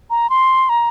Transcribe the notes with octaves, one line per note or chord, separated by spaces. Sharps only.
A#5
C6
A#5